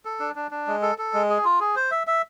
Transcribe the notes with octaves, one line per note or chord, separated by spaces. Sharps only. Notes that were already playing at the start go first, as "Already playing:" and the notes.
A4
D4
D4
D4
G#3
A4
A4
G#3
G#4
F4
G#4
C5
E5
E5